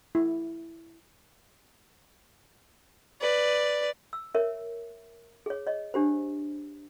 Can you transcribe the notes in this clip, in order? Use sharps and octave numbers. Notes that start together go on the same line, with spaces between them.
E4
B4 D5
E6
A#4 C#5 E5
G#4 C#5
C#5 D#5
D4 G4 C5